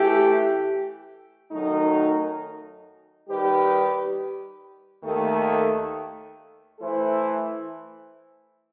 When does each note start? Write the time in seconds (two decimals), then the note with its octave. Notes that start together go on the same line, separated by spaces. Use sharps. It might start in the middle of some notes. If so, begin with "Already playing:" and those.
Already playing: E3 A3 E4 G4
1.51 F#2 D#3 F#3 A3 D#4
3.26 D#3 G3 D#4 G4 B4
5.03 D#2 D#3 A3
6.79 E3 A3 E4 A4 C5